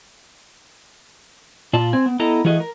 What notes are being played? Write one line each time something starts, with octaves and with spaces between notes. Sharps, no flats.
A#2 F4 D5 A5
C4 G#5
B3
B3 E4 A4 D#5 A#5
E3 A3 F#4 G#4 D#5
A#4